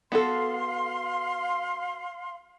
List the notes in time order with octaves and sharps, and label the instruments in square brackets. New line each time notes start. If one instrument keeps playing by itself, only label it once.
[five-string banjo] B3 F#4 A4 [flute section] F5 C6